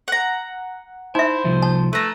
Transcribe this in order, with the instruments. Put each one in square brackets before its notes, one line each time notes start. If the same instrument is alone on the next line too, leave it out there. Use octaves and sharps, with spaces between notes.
[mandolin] F#5 A#5
[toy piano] D#4 E5 [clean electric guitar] E4 [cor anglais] C5
[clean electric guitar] C2 F3
[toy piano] A5
[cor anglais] A3 [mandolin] B4 A#5